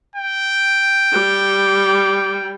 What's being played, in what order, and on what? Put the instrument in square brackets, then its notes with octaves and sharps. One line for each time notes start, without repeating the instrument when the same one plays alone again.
[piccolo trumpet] G5
[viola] G3